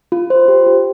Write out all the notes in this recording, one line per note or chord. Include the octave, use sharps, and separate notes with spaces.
F4
C5
G4
G4